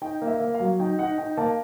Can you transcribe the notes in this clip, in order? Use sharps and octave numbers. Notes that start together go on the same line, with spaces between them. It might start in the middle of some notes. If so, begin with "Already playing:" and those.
D#4 G5
A#3
E5
A#3
F5
F#3
D#4 G5
D#4 F#5
D#4 G5
A#3 A5